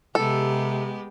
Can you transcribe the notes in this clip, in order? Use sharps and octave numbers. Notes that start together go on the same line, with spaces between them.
C3 G#3 B3 G4 A4